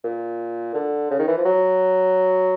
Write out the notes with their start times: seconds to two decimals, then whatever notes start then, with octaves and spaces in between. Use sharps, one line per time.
0.04 A#2
0.74 D3
1.11 C#3
1.19 D#3
1.27 E3
1.37 F3
1.45 F#3